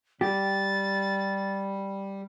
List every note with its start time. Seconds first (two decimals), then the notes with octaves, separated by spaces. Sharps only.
0.21 G3 G4 A6